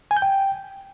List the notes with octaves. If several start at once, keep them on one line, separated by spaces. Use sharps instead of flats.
G#5
G6
G5